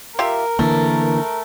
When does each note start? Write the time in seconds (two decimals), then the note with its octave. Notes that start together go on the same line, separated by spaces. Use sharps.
0.19 F4 G4 A#4 E5
0.59 D3 E3 A3 A#3